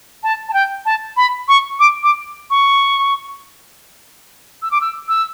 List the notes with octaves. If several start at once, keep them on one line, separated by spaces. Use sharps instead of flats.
A5
A5
G5
A5
B5
C#6
D6
D6
C#6
E6
D6
E6
E6